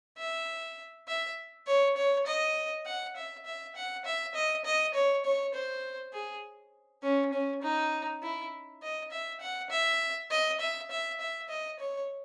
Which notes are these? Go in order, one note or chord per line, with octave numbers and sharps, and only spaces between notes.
E5
E5
C#5
C#5
D#5
F#5
E5
E5
F#5
E5
D#5
D#5
C#5
C#5
C5
G#4
C#4
C#4
D#4
E4
D#5
E5
F#5
E5
D#5
E5
E5
E5
D#5
C#5